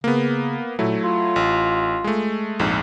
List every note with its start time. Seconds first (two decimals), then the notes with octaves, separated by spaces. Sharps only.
0.04 C#3 A#3 B3
0.79 A#2 F#3 A3 E4
1.03 F4
1.36 A1
2.04 G#3 A3
2.59 A#1 F2 G#2